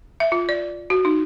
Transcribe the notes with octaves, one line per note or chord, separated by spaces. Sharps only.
E5
F4
D5
F#4
D#4